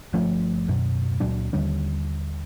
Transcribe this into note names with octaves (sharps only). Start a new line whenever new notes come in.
G1 F3 A3 C#4
D1 F#2 B2 F#3
C#2 A#2 F#3 D4
D#2 D3 G3 C#4